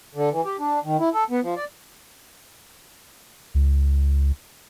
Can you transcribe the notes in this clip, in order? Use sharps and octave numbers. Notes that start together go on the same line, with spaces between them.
D3
E3
G4
D4
D#3
E4
A4
B3
F3
D5
C#2